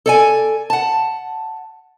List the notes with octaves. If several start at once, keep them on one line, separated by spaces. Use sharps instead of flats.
A4 D5 G#5
F#5 A5